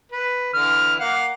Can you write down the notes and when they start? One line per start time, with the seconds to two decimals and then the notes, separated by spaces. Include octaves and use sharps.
0.12 B4
0.54 D3 E3 F6
0.99 A#3 F5 F#5